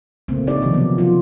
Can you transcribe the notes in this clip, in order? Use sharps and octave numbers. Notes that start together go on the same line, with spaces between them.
A#2 C#3 A3 A#3 C4
D#4 G4 C#5 D5
C3 D#3 F3
F3 F#3 B3
F3 F4